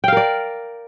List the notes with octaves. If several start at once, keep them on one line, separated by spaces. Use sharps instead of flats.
A#4 D5 F5 G5